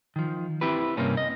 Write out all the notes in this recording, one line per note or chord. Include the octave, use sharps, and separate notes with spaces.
D#3 F3
C4 E4 G4 B4
G2 C3 A#3 C#4
D#5